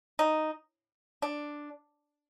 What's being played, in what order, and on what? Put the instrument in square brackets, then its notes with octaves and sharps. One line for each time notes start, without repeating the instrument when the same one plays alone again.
[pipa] D#4
D4